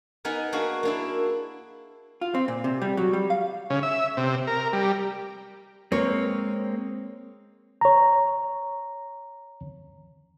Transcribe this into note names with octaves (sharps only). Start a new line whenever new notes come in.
B3 D#4 A#4 G#5
A#3 D4 F#4 G#4 A#4
A#3 D4 E4
F4
C4
A#2
C3
G3
F#3
G3
F5
C#3
E5
C3
A#4
G3
G#3 A#3 C4 C#5
C#5 A#5